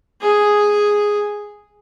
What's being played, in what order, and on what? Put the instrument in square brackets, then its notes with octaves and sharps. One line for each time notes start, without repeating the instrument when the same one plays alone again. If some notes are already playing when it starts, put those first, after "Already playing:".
[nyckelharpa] G#4